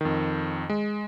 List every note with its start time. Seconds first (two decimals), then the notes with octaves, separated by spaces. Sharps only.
0.01 F2 D#3
0.70 G#3